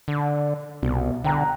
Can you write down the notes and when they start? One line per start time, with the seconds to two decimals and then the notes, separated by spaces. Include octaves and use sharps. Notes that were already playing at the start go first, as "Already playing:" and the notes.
0.08 D3
0.83 C2 B2
1.24 D3 G5 A#5 F#6